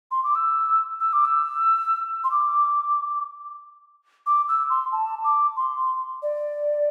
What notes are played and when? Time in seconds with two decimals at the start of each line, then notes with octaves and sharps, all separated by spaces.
0.11 C6
0.24 D6
0.35 E6
1.00 E6
1.13 D6
1.25 E6
2.24 C6
2.31 D6
4.26 D6
4.48 E6
4.70 C6
4.92 A5
5.24 D6
5.57 C6
6.22 D5